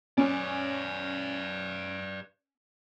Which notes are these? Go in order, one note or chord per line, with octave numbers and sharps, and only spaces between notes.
C#4 B4 D5